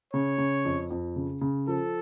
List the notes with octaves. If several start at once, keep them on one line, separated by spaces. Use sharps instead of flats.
C#3 C#5
C#3
F2
F2
C#3
C#3
F3 A4